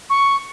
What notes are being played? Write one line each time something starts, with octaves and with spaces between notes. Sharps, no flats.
C#6